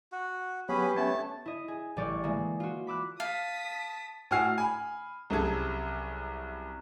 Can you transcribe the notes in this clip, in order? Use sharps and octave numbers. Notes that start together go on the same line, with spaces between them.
F#4
F#3 B3 C#4 G4 G#4 B4 B5
A3 B3 C#4 C#5 A5
E4 D#5
G#4
A1 G3 D5 C#6
E3 G#3 A#3
F4 F#4
B5 D6 E6 F#6
F5 A5 D#6 B6
A2 F#4 G#5 F6 C7
G#5 B5
C2 F#2 G3 G#4 A4 G#6